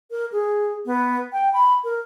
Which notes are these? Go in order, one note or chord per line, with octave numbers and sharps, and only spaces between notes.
A#4
G#4
B3
G5
B5
A#4